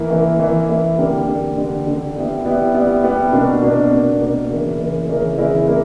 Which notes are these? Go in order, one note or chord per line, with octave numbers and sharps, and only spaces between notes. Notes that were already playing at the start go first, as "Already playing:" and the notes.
Already playing: E3 A#3 E4
E3 A#3 E4
E3 A#3 E4
E3 A#3 E4
D3 G3 A#3
D3 G3 A#3
D3 G3 A#3
D3 G3 A#3
G3 B3 E4
G3 B3 E4
G3 B3 E4
G3 B3 E4
B2 A#3 D4
B2 A#3 D4
B2 A#3 D4
B2 A#3 D4
C#3 E3 A#3 E4 A#4
C#3 E3 A#3 E4 A#4
C#3 E3 A#3 E4 A#4
C#3 E3 A#3 E4 A#4
A#3 E4